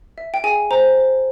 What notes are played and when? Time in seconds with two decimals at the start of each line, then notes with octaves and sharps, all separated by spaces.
0.18 E5
0.34 G5
0.44 G#4 G#5
0.71 C5 A#5
0.97 C5